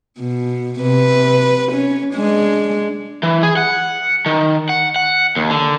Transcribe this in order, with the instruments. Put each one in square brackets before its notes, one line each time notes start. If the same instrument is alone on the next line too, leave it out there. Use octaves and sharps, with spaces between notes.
[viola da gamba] B2
C3 B4
C#4
G#3 D4
[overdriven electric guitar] E3
G#4
F#5
D#3
F#5
F#5
D#2
D3